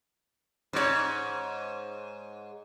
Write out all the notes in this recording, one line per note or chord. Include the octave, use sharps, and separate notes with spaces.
G#2 C#5